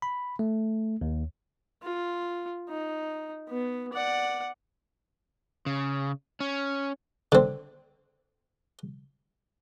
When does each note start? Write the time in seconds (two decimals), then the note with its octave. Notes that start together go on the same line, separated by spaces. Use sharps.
0.02 B5
0.39 A3
1.01 D#2
1.83 F4
2.69 D#4
3.49 B3
3.93 D5 F#5
5.66 C#3
6.40 C#4
7.32 D3 C4